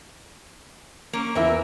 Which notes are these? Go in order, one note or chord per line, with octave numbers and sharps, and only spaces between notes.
A#3 C#4
E2 E4 A#4 E5